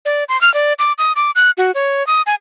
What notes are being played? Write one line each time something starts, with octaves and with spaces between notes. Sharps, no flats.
D5
C6
F6
D5
D6
D#6
D6
F#6
F#4
C#5
D#6
G#5